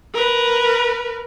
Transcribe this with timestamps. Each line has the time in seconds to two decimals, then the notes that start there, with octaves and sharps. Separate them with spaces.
0.14 A#4 B4